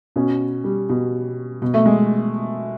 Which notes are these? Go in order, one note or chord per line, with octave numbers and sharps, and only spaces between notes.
B2 C#4
G3
B2
B2
A3
G#3